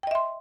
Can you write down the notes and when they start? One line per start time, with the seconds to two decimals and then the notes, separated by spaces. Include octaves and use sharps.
0.03 G5
0.07 D#5
0.11 E5
0.15 C6